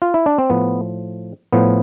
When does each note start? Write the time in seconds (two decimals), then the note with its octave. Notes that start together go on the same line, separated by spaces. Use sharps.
0.02 F4
0.14 E4
0.26 D4
0.38 C4
0.50 A2 F3 B3
1.53 A2 F3 B3